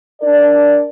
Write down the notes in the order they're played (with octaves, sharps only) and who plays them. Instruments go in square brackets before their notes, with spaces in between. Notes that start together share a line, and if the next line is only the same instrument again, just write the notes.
[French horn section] D4 A#4 D5